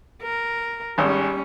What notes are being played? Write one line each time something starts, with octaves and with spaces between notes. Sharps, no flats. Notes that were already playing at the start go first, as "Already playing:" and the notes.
A#4
G#1 G3 C#4